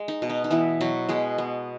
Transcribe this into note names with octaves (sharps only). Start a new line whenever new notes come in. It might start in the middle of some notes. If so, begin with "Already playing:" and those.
Already playing: G#3
D#4
B2
D#4
D#4
E3 B3 E4
B2 F#3 F#4
B2 G#3 G#4
B3